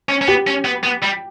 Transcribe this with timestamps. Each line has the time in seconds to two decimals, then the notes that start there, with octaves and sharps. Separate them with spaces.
0.09 C#4
0.21 C#4
0.27 B3 G4
0.47 C#4
0.65 B3
0.84 B3
1.03 G3